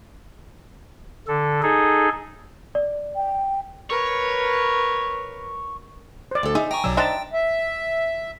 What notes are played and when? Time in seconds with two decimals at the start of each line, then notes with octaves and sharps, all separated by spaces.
1.28 D3 A4
1.62 D#4 G#4 A4
2.75 D5
3.16 G5
3.90 A#4 B4 C#5
6.31 C5 D5
6.43 D2 A4
6.55 D#4 G#4 E5
6.71 G5 G#5 A#5 C#6
6.84 B1 B2 F#3 D5 E6
6.97 D4 D#4 C5 E5 G5 A5
7.33 E5